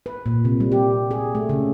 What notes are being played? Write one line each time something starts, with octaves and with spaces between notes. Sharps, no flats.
B4
A#2
C3
G3
G4
G#4
A3
C#3